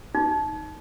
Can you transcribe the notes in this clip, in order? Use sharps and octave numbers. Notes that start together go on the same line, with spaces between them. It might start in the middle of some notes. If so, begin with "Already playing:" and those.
D#4